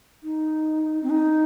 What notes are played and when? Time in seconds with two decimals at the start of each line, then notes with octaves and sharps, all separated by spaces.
0.23 D#4
1.03 C4
1.10 D#4